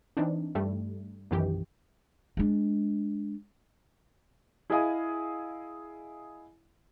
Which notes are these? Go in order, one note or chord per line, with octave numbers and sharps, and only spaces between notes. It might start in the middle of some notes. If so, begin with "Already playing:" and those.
E3 C4 D4 D#4
G2 G3 A3
B1 F#2 D#3 E3 G4
G#3 D4
E4 G#4 D#5 F5 G#5 D#6